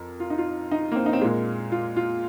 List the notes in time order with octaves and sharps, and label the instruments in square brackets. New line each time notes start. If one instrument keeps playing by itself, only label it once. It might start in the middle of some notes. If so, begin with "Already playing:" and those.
Already playing: [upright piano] F2 A#4
F4
D#4
F4
D#4
A#3
C4
D#4
C4
A#2 G#3 A#3
F4
F4